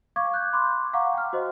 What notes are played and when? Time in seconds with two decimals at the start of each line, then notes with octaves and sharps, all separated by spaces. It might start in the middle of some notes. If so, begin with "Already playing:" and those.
0.16 F5 C#6 D6 G#6
0.34 F#6 G6
0.53 B5 C6 D6
0.93 F5 F#5 A#5 C#6 D6
1.13 G5 F6
1.33 F#4 C5 D#5